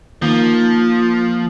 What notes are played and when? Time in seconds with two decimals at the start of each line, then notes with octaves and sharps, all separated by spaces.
0.22 D#3 F3 A#3 D#4
0.54 A#3